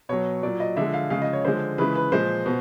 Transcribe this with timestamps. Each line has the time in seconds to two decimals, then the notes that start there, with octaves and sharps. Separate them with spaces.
0.09 B2 F#3 C#5
0.43 A#2 F#3 D5
0.60 D#5
0.76 D3 F3 G#3 E5
0.94 F5
1.10 C#3 F3 G#3 F5
1.22 D#5
1.33 C#5
1.44 D3 F3 G#3 C5
1.78 C#3 E3 G#3 B4
1.95 B4
2.12 A#2 F3 G#3 C5
2.46 B2